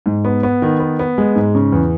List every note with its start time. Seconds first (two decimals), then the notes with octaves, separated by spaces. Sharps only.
0.06 G#2
0.25 B3
0.43 B3
0.62 D#3
0.80 B3
0.99 B3
1.18 G#3
1.35 G#2
1.55 C#3
1.72 E2